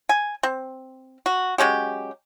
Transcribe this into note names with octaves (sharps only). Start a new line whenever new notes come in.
G#5
C4
F#4
F#3 G#3 C#4 G4